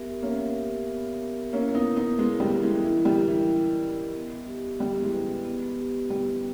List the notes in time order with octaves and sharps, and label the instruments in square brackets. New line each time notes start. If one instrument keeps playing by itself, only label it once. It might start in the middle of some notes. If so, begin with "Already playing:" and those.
Already playing: [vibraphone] B3 G4 A#4 E5
[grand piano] A#3 C#4 [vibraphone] E5
[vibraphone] G4
B3
A#4
[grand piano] A#3 C#4 [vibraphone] E4
[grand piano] B3 D#4
[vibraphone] A#4
[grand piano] B3 D#4
[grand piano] G#3 B3 [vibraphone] E4
[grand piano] G3
[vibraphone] D#5
[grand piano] E3 G#3
[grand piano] E3 [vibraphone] E4
[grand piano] G3
[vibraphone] A#4
[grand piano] E3
[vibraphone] E4
D#5
B3
G4
[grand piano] G3 [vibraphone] B3
[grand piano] E3 G#3
[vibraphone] B4
[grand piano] E3
[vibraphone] B3
G4
[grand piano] G3 [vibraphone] B3